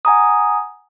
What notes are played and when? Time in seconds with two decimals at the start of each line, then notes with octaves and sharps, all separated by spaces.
0.05 F#5 G#5 A#5 D#6